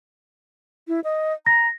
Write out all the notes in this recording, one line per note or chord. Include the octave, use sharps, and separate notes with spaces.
E4
D#5
A#5 A#6